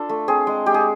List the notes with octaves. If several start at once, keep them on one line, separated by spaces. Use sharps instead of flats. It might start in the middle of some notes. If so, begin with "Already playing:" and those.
Already playing: D4 F4 A4
A3
C4 G#4
G#3
G#3 G4
G#4